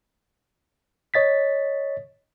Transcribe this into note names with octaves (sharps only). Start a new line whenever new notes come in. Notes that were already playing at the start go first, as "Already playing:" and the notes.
C#5 D#5 A6 B6